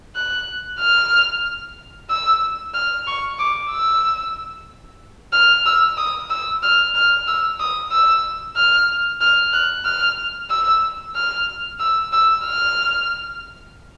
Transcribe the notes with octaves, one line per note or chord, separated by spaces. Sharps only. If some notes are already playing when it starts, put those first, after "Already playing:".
F#6
F6
E6
F6
C#6
D6
E6
F6
E6
D#6
E6
F6
F6
E6
D#6
E6
F6
F6
F#6
F6
E6
F6
E6
E6
F6